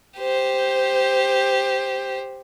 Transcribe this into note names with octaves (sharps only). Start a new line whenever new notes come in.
G4 C5